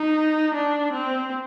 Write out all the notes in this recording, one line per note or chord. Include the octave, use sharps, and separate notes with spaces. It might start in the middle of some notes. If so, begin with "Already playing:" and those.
Already playing: D#4
D4
C4